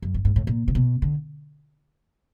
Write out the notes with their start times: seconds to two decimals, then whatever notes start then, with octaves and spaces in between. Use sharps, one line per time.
0.02 F#2
0.14 G2
0.25 G#2
0.36 A2
0.47 A#2
0.68 C3
0.75 B2
1.02 D3